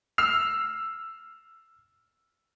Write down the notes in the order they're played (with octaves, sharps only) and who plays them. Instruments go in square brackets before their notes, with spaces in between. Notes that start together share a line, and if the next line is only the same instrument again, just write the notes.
[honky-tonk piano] E6 F6 C7 F7